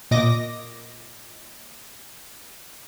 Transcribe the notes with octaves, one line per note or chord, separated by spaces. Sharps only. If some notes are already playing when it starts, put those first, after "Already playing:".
A#2 D#5 D6 A#6